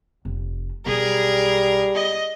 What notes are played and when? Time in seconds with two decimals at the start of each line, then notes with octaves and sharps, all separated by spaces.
0.25 F1
0.86 B1 G3 G#4 A#4
1.95 D#5